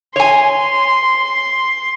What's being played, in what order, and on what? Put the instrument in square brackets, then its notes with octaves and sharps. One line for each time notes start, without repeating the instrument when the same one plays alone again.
[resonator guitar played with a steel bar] C#5 G#5 [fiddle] C6